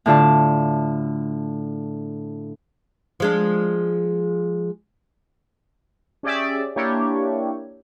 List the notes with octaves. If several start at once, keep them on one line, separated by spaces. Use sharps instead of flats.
A2 D3 F4 A5
F3 G#3 D4
C#4 G4 G#4 D5 E5
A#3 D4 E4 G4 C#5